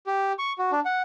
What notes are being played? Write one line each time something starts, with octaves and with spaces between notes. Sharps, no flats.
G4
C#6
F#4
D4
F#5